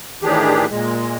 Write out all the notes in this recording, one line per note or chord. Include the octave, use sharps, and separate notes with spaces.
A2 D#3 E3 D4 G4 G#4
A#2 G#3